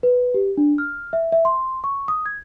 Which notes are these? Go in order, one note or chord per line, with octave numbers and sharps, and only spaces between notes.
B4
G4
D4
F6
E5
E5
C6
C#6
D#6
G#6